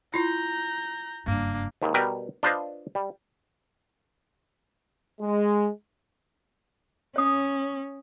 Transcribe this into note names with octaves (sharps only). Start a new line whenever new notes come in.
E4 F4 A#5 G6
F#1 G2 A#3 D4
D#2 G#2
B2 G3 A#4 B4 G5
D4 F4 B4 C5 D#5
G3
G#3
C#4 C#5 D#6